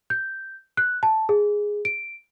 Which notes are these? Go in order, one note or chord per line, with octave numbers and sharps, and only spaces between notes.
G6
F#6
A5
G#4
D7